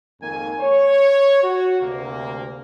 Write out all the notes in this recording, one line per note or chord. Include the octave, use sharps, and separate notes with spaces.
F2 G#2 D#3 A#3 G#5
C#5
F#4
D2 C3 A#3